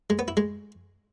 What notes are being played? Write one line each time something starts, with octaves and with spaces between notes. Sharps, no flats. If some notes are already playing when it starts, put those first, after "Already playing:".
G#3
B3
E4
G#3